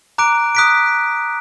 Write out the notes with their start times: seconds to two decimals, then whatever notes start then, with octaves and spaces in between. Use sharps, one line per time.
0.18 A#5 D6 F#6 D7
0.55 D#6 F#6 B6 D7